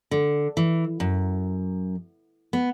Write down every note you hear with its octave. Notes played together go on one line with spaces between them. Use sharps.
D3
E3
F#2
B3